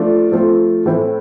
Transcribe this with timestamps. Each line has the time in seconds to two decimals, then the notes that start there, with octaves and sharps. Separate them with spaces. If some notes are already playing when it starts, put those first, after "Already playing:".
Already playing: F3 A3 D4 F4
0.32 F3 A3 C4 F4
0.86 A2 E3 A3 C4 E4